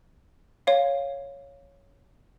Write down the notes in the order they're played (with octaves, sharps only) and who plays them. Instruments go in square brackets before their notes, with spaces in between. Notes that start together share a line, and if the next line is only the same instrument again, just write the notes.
[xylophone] C#5 F5